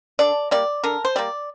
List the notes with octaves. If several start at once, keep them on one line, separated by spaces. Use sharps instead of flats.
D3 D5
G3 A#3 D5
D3 A#4
C5
G3 A#3 D5